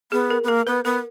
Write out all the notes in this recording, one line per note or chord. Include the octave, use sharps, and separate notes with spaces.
B3 G#4
A#4
B3
A#3 A#4
B3 B4
B3 A#4